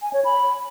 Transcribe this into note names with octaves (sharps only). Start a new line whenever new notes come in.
G#5
C#5
B5